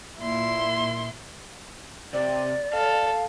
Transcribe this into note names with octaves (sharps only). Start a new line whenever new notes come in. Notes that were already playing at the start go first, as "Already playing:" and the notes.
A#2 E4 C6
C3 D5
A4 F5